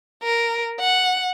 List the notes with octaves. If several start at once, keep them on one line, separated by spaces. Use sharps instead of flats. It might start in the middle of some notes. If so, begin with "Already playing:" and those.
A#4
F#5